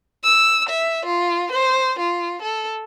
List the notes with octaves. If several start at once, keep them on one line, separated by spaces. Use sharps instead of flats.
E6
E5
F4
C5
F4
A4